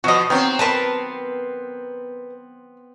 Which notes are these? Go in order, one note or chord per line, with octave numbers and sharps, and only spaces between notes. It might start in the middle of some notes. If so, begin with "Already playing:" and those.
B2 F3 F#4 D#5
D#3 F#3 B3 C4
A#4 B4 A5